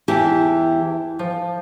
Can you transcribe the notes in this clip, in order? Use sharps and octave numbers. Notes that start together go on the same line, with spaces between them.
E2 E3 E4 G4 A5
F3